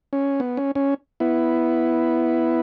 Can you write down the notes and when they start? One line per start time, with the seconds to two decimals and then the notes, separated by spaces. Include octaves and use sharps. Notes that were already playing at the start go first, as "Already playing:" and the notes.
0.13 C#4
0.40 B3
0.57 C#4
0.75 C#4
1.20 B3 E4